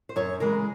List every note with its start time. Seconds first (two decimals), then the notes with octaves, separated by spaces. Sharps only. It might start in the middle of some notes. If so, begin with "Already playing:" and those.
0.09 C5
0.16 F#2 C#5
0.40 C#3 E3 G#3 A#4